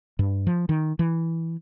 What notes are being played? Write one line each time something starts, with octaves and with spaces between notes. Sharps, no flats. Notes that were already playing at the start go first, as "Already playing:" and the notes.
G2
F3
D#3
E3